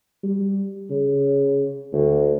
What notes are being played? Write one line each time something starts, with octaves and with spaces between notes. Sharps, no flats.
G3
C#3
D2